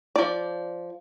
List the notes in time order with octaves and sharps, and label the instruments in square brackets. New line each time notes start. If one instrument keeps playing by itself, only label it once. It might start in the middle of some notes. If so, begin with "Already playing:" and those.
[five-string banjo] F3 D5